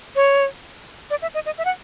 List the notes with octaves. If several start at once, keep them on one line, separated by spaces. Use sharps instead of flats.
C#5
D5
E5
D#5
D#5
E5
F#5